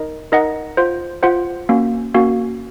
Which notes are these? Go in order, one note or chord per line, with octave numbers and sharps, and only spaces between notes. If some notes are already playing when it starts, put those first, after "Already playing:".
Already playing: D#4 A#4 D#5
D#4 A#4 D#5 F#5
F4 C5 F#5
F4 C5 F#5
A#3 C#4 F#4
A#3 C#4 F#4